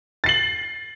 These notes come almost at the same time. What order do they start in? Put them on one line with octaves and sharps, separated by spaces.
A6 C7 F#7